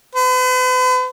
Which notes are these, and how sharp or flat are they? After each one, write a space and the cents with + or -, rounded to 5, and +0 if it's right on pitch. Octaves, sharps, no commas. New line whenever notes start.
B4 +45